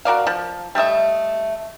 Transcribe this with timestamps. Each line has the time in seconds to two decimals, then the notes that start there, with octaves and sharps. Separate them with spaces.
0.05 F#4 A#4 D5 F5
0.27 F3
0.75 G3 A3 D#5 E5